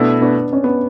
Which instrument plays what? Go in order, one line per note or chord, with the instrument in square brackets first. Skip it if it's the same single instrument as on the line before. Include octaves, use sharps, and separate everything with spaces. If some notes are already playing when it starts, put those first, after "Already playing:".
Already playing: [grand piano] B2 A3 E4 A4 [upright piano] B3 D4
[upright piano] B3 D4
C#4
B3